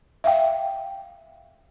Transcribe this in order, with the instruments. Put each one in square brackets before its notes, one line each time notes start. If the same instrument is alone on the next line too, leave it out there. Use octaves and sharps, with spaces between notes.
[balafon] E5 F5 G5